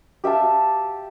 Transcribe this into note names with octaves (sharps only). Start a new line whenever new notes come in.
G4 E5 F5 A5